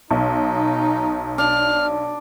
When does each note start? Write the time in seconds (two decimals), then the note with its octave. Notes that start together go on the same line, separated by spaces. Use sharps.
0.11 B1 D#4
1.38 D4 F6